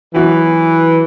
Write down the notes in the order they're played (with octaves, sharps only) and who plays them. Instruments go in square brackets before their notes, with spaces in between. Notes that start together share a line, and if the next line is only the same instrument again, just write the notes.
[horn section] E3 [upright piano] F#3 B3 F#4 B4